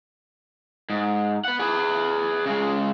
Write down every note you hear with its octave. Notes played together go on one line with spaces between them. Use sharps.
G#2
B4 F#5
G#4 B4
C#3 G#3